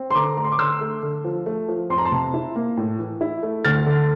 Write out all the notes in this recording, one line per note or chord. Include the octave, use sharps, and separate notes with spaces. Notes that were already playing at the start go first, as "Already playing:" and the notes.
Already playing: C4
C6
D3 A#5 D6
A3 A#5
C6
D6
D3 C6 E6
A3
D3
F3
A3
F3
F2 C6
A#5
A5 C6
C3
E4
A#3
A2
E3
E4
A3
D2 F6 A6
D3